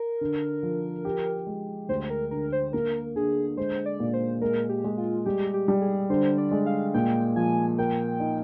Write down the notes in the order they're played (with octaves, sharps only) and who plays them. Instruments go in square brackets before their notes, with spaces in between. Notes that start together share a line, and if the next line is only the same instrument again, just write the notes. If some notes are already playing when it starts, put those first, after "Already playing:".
Already playing: [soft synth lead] A#4
[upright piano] D3
F3
G4
G#3
[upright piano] D2 [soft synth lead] C5
[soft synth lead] A#4
[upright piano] D3 [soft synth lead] A#4
[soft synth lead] C5
[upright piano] A#3 [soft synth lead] A#4
[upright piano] D3 [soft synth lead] G#4
[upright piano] G#3 [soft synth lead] C5
[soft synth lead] D5
[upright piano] A#2
[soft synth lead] C5
[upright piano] G#3 [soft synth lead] A#4
[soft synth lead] G4
[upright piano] G#3
[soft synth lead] F4
[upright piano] G3 [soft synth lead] G4
[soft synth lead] G4
[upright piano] G3
[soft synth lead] G#4
[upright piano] D3 [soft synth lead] C5
[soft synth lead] D5
[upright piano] G#3
[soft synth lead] F5
[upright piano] A#2 [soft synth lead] G5
[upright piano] F3 [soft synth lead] G#5
[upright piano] A#4 [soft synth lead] G5
[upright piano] D#4